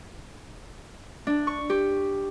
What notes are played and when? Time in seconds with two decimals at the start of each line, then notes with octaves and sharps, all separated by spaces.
1.27 D4
1.47 C#6
1.70 G4